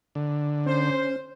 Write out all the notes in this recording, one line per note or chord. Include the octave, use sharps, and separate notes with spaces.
D3
C#4 C5